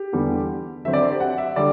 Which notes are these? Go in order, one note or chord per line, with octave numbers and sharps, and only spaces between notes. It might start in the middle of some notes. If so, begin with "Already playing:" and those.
Already playing: G4
E2 D3 G3 B3
D3 F#3 C4 E5
D5
C5
G4
F#5
E5
D3 G3 D5